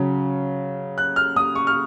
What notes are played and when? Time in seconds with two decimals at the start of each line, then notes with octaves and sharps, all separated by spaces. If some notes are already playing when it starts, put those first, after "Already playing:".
Already playing: C#3 F#3 C#4
0.98 F#6
1.16 F6
1.36 D#6
1.55 C#6
1.67 F6